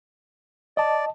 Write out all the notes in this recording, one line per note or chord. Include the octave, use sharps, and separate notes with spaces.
D5 D#5 A5